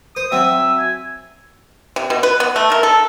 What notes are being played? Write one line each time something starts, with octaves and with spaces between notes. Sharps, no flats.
C5 D#6
F#3 C4 E5
G#5
C3
B2
B4
B3
A3
A#4
A4